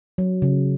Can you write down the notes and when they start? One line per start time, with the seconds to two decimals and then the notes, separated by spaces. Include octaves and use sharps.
0.18 F#3
0.42 C#3